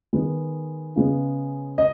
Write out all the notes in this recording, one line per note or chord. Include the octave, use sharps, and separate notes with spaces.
D#3 G#3 B3
C#3 G#3 B3
D#5